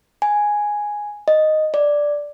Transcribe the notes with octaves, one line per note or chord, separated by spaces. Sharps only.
G#5
D#5
D5